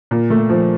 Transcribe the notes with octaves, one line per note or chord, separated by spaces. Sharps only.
A#2
A3
F3